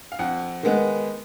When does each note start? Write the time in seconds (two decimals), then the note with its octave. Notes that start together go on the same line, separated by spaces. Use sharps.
0.12 F5
0.19 F2 F#5
0.63 D#3 G#3 B3